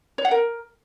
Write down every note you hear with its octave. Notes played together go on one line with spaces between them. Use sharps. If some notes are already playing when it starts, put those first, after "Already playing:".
C#5
F#5
A#4